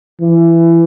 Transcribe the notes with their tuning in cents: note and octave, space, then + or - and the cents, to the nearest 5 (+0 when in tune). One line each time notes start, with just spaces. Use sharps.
E3 +20